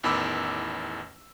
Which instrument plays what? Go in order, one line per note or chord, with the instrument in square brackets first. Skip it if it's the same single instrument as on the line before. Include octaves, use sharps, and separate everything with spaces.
[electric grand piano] A1 E2 D#3 B5 D6 E6